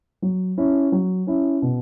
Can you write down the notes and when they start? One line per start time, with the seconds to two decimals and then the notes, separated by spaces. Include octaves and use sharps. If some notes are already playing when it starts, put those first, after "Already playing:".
0.22 F#3
0.58 C#4 E4
0.92 F#3
1.27 C#4 E4
1.62 B2